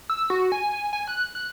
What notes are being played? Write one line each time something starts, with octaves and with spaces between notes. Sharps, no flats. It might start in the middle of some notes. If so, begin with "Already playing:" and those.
E6
F#4
G#5
G#5
F#6
F#6